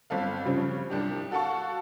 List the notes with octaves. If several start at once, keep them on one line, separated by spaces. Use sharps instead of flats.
G1 C4 A4 F5
C#3 F3 G3 C4 C#4
C2 D4 G4
F#4 A4 F5 F#5 A5 C#6